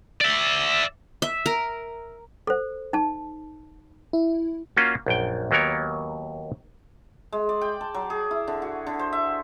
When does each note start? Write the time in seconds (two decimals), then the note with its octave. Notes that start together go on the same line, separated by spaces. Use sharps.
0.21 D5 E5
1.22 E5
1.46 A#4
2.47 A4 C5
2.93 D#4 A5
4.13 E4
4.77 A#3 C#4 F4 F#4
5.06 A#1 F#2 G5
5.51 D#2 F#3 A#3 B3 A#4 C#5
7.32 G#3
7.49 D5
7.61 G5
7.81 A5
7.94 F#3
8.10 G#4
8.31 E4
8.47 D3
8.62 F#4
8.87 D3
8.99 C5
9.13 E5